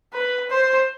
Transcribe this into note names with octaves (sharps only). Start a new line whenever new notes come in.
B4
C5